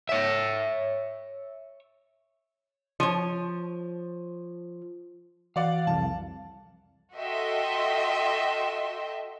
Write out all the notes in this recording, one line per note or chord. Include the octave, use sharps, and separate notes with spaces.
C#5 E5
F3 C#5
E3 F#4 D5 F5 F#5
C2 F2 A5
F#4 A4 D#5 E5 G5 C6